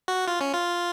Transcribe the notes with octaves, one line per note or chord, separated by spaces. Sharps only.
F#4
F4
C#4
F4